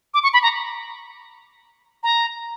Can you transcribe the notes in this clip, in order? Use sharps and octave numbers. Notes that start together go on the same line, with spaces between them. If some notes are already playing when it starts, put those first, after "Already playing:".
D6
C#6
B5
A#5
A#5